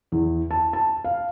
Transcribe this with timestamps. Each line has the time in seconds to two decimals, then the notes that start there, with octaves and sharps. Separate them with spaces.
0.12 E2
0.51 A5
0.73 A5
1.04 F5